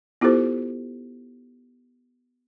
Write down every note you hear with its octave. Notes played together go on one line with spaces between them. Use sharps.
B3 E4 F4 G4 A4 C5